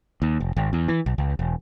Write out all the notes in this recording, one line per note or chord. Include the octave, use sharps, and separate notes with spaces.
D#2
F1
G#1
E2
E3
B1
C#2
E1